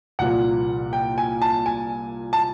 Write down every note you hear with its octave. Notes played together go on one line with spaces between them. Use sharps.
C2 A#2 F3 F#5
G5
G#5
A5
G#5
A5